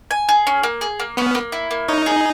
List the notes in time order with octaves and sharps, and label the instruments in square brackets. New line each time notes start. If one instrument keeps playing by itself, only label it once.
[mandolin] G#5
G#4
C#4
A#3
G#4
A#3
[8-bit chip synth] B3 [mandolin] C#4
[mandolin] A#3
E4
A#3
[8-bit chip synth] D#4 [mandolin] C#5
[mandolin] G#4